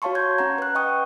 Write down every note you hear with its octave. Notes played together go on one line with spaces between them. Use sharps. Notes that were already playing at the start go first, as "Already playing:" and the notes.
F#4 C#5 F5 A5 C6 C#6
C#6 G6 G#6
C#4 F#5 A#5
B4 F#6
D#5 F#5 G5 C#6 D#6